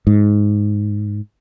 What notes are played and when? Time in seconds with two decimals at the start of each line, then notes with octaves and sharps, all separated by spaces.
0.07 G#2